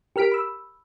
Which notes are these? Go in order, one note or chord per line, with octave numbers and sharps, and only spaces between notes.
G4 A#4 F6 B6 D7
B5 E6